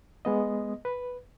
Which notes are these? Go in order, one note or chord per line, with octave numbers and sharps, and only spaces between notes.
G#3 B3 D#5
B4